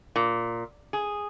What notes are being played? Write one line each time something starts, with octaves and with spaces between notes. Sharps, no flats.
A#2
G#4